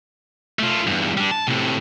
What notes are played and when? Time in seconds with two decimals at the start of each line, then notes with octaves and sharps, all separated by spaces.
0.59 A3 F4
0.87 E2 G2
1.18 G3 D4
1.31 A5
1.48 A2 C3